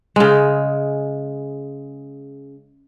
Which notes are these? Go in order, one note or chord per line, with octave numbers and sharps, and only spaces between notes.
C#3 G#3